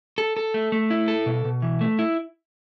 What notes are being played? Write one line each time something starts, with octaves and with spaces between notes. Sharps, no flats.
A4
A4
A3
A3
E4
A4
B2
B2
E3
A3
E4